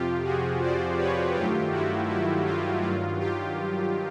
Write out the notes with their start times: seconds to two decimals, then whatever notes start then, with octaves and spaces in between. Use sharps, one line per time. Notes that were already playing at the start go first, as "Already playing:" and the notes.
Already playing: F2 C3 F3 F4 G4
0.24 F#4 G#4
0.61 C5 D5
0.97 B4 C#5
1.35 G2 D#3 F#3 A3 F4 G4
1.71 E4 F#4
2.09 E4
2.46 F4
2.82 G2 D#3 F#3 F4
3.20 F4 G4